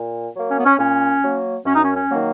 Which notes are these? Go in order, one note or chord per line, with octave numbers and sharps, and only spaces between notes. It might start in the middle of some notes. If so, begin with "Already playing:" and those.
Already playing: A#2
F#3 A#3
C#4
B3
C#4
A#2 C#4
F#3 A#3
F#2 C#4
D#4
C#4
C#4
D#3 F#3 A#3